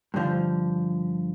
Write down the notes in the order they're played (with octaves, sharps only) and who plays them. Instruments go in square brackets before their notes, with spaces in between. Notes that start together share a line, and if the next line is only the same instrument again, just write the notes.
[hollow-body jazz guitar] G2 D3 F3